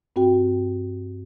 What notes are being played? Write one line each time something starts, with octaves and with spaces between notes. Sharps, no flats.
G2 C4 F#4 G5